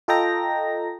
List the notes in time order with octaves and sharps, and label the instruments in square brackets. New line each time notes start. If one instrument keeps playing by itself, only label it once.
[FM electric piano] F4 A4 D#5 G5 A#5 A#6